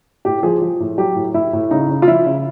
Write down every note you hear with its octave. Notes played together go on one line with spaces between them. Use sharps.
A2 G4
F3 G#4
F3
A2
F#3 G4
A2
A2 E4
A2
C#3 D#4
C#3
F4
F3 E4
C#3